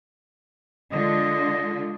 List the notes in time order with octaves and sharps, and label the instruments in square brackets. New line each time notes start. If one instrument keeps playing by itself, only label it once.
[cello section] D3 G#3 F4 [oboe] D#5